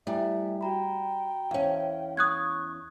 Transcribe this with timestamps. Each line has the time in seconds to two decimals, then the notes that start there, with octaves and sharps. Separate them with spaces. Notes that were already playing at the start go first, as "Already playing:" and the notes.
0.07 G3 A3 E4 E5 G#5
0.61 F#4 G5 A#5 B5
1.51 E2 C#4 F5
2.17 C#6 D#6 F#6 G#6